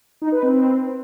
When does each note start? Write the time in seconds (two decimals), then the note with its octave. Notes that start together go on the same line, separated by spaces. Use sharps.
0.22 D#4
0.32 B4
0.43 C4